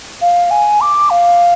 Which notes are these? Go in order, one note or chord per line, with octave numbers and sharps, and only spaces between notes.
F5
G#5
D6
F5